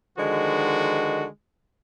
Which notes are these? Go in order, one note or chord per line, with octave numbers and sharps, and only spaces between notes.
D3 D#3 F3 G#3 F#4